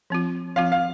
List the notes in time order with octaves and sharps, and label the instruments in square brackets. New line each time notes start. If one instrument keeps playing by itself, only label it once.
[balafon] F3 C4 F4
[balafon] F3 C4 F4 [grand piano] F5
[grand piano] F5